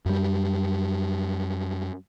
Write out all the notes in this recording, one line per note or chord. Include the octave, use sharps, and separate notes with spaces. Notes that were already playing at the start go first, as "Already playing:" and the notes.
F#2 G3